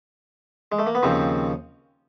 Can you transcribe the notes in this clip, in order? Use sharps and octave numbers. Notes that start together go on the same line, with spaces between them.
G#3
A3
A#3
B3
D#2 C#3 F3 C4